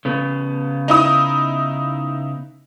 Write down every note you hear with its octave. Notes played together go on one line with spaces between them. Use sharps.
C#3 B3
D#4 E4 D#6